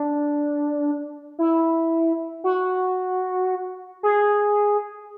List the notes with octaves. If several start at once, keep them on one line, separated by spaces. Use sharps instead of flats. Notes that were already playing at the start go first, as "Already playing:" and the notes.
Already playing: D4
E4
F#4
G#4